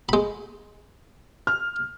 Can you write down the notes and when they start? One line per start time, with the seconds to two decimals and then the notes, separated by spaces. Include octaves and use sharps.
0.09 G#3 B5
1.47 F6